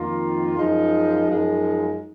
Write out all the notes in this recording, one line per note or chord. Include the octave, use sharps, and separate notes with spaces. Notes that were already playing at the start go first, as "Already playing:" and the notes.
Already playing: F2 D#3 A#3 F4
F#2 F3 G#3 D#4
F#2 F3 G#3 D#4